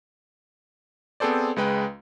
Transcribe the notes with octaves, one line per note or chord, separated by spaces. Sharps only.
B3 C4 G#4 A4 C5 D5
C#2 G#3 B4 G5